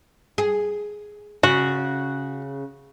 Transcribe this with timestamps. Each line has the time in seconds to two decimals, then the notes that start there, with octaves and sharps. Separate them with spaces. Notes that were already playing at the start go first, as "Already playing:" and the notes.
0.38 G#4
1.43 C#3 F#4